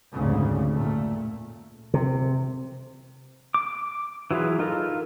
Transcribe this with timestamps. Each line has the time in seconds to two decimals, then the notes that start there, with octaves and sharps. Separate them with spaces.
0.13 F1 D2 G#2 C#3
0.73 A#2 A3
1.94 C3
3.54 D6
4.31 E3 F#3 F4 G#4 B4
4.59 D#4 F4 A4 A#4